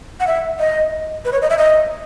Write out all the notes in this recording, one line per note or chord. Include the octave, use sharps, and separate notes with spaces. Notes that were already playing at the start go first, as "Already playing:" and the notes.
F#5
E5
D#5
B4
C#5
D#5
E5
D#5